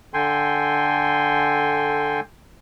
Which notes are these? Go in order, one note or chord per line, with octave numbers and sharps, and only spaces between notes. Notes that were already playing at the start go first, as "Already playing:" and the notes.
D3 A4 G5 G#5 C6